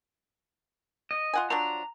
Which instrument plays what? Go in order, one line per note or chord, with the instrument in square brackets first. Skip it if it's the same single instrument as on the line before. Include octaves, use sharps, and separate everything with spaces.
[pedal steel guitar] D#5
[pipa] F4 F#5 G#5
[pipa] F3 F#3 D4 [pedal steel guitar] A#5